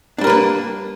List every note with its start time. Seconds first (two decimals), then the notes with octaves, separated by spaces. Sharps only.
0.18 D4
0.21 G3
0.24 A#4
0.27 B4
0.30 A#3